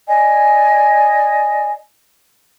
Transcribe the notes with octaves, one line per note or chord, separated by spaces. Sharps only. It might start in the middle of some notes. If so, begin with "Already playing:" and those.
D5 D#5 G#5